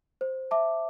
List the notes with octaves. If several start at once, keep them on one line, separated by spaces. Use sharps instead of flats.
C5
E5 A5 D6